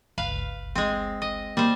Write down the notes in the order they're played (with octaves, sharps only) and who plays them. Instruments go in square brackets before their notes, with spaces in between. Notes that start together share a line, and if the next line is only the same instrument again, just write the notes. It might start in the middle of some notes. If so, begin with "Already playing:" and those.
[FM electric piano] G1 C#2 [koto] B4 F5
[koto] G#3 C4
D#5
[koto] G3 C5 [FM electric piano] A#3